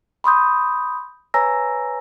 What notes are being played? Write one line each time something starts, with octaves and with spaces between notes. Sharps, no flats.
B5 C6 D#6 G6
B4 C#5 G#5 A#5 E6 A#6